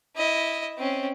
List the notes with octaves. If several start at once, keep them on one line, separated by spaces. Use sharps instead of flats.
E4 D#5
C4 C#4